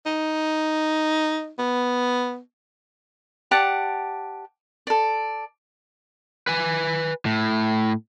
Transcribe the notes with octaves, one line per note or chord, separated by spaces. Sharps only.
D#4
B3
G4 D5 F#5 A5
A4 D5
B4 G#5
A2